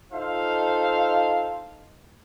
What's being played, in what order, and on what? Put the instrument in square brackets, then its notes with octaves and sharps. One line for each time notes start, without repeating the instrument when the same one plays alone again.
[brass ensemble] D#4 F4 A4 C5 F5